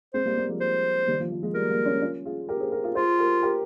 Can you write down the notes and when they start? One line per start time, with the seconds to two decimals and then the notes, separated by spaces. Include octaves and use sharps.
0.14 G#3 C4 C5
0.25 G3 A#3
0.37 G3 A#3
0.49 F3 G#3
0.61 C5
1.07 D#3 G3
1.20 F3
1.32 F3
1.43 F3 G#3
1.54 G3 A#3 A#4
1.70 G3 A#3
1.86 A#3 C#4
2.01 C#4 F4
2.25 F4 G#4
2.48 G4 A#4
2.60 G#4 C5
2.72 G4 A#4
2.84 F4 G#4
2.95 F4 G#4 C5
3.19 G4 A#4
3.43 G4 A#4